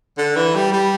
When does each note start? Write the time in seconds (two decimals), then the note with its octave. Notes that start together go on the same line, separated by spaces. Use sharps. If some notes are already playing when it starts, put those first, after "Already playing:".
0.18 D3
0.36 E3
0.55 G3
0.73 G3